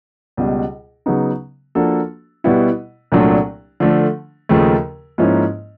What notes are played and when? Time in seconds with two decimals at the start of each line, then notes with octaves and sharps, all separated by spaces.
0.37 C#2 B2 G3
1.06 C#3 F#3 B3 D#4
1.75 F3 A#3 D4 F#4 A4
2.44 B2 G3 B3 E4
3.12 C2 A#2 F#3 A3 D4
3.80 D3 F3 A3 D4
4.49 D#2 C#3 F3 A3
5.18 G#2 F3 A#3 C#4 E4